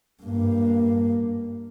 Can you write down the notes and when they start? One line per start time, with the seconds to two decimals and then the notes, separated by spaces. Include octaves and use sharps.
0.23 G2 A#3